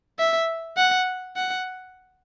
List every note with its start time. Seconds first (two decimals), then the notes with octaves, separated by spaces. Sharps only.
0.19 E5
0.77 F#5
1.37 F#5